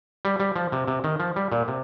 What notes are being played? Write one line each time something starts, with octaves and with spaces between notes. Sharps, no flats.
G3
G3
F3
C3
C3
D#3
F3
G3
A#2
C3